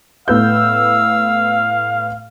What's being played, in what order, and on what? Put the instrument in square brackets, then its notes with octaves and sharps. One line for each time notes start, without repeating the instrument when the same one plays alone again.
[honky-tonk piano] A2 B3 G6 [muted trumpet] F5 [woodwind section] E6